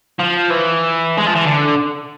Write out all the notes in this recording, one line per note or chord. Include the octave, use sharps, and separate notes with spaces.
F3
E3
G#3
F3
E3
D3